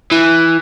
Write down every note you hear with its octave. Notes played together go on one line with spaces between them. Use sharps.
E3